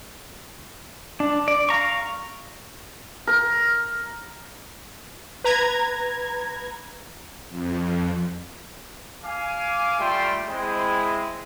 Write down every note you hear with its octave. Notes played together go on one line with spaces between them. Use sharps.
D4
D5
F5 A#5 C#6
A#4
B4 A#5 G#6
F2
F5 G#5 D6
G3 A3 F4 E5 G5 C6
G#3 C4 E4